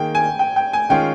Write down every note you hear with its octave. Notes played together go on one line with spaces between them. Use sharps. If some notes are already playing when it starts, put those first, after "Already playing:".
Already playing: D#3 A#3 G#4 G5
G#5
G5
G5
G#5
D#3 G#3 C#4 F4 G#4 G5